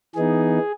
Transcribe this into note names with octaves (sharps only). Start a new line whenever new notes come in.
E3 B3 D#4 G#4